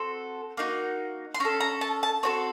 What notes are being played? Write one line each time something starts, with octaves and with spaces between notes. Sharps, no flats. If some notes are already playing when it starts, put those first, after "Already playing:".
Already playing: C4 F#4 A4
A#3 D#4 F#4
C6
C#4 A4 A#5
A#5
A5
A5
C4 F#4 A4 C#5